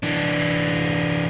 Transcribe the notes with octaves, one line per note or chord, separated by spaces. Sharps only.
E3 D4